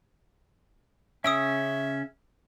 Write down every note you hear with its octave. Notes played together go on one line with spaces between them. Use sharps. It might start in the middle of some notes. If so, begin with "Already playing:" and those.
C#3 C#4 E5 D#6 E6 D7